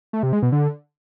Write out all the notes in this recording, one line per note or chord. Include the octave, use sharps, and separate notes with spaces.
A3
C3
G#3
B2
D3